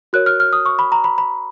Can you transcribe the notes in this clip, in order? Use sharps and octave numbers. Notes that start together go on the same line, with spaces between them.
F#4 A#4 C#5 F#6
F6
F6
D#6
C#6
B5
A#5
B5
B5